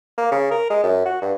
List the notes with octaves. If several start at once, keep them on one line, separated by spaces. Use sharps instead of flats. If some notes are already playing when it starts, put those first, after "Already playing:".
A#3
C#3
A#4
G#3
F#2
F#4
G2